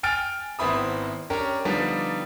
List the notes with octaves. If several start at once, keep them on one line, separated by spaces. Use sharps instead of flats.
G5 G#5 F6 A6 D7
G#1 B3 C4 E4 B5 D#6
C#4 D4 G4 A#4
D3 F3 G3 B3 D4 D#4